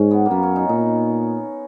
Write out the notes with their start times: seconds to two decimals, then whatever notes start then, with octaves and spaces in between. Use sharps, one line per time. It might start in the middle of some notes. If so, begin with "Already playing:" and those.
Already playing: G#2 C#4
0.11 B3
0.26 A#3
0.31 F#2 B3
0.43 C#4
0.56 D#4
0.69 A#2 D#4